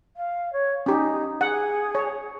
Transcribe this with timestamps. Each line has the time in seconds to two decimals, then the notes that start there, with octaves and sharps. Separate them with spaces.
0.16 F5
0.52 C#5
0.86 C#4 D#4 G4
1.41 G#4 F#5
1.95 C#5